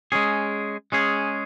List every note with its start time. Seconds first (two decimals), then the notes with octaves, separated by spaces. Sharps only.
0.12 G#3 C#4 G#4
0.92 G#3 C#4 G#4